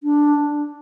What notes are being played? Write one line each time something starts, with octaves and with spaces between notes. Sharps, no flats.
D4